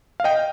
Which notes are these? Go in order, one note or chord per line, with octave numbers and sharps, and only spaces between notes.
F5
D#5 G5